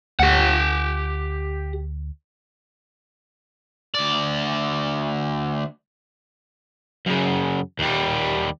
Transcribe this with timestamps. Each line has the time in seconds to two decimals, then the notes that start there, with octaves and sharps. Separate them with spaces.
0.20 D2 G4 F#5
3.95 D2 D5
7.06 F#2 C#3
7.79 D#2 G3